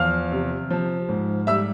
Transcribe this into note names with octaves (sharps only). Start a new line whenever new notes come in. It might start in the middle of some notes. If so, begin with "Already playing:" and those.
Already playing: E2 F3 F5 F6
C3
F3
G#2
G3 E5 E6